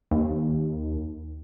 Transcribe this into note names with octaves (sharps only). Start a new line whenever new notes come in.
D#2